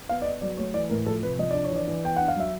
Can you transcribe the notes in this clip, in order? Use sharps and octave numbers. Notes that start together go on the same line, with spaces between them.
B3 F5
D5
B3 D#5
F#3 D5
A3 C#5
E3 D5
A2 A#4
F3 A4
C3 B4
F3 D#5
D4 D5
C#5
E3
D5
E3
B3 G5
D4 F#5
F5
F#3 E5